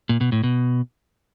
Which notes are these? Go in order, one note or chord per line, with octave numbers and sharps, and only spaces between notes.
A#2
B2
A2
B2